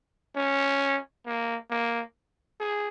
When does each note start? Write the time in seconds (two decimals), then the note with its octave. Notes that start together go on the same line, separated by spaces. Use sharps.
0.36 C#4
1.26 A#3
1.70 A#3
2.60 G#4